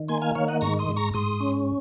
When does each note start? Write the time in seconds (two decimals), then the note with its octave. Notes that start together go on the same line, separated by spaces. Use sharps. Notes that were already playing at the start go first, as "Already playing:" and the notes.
Already playing: D#3
0.08 A#3 G#5 C6
0.22 F5 G#5
0.35 D#3 C#5 F5
0.48 D#5 F#5
0.61 G#2 A#5 C#6
0.79 C6 D#6
0.88 G#2
0.96 A#5 C#6
1.14 G#2 C6 D#6
1.40 C#4